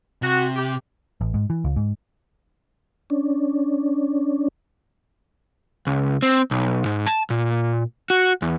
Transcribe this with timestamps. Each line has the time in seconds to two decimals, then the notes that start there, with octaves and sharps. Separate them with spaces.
0.22 C3 F#4
0.56 G4
1.21 A1
1.34 G#2
1.50 E3
1.64 C#2
1.76 G#2
3.10 C#4 D4
5.87 C#2
6.22 C4
6.51 B1
6.86 G#2
7.06 A5
7.30 A#2
8.10 F#4
8.42 E2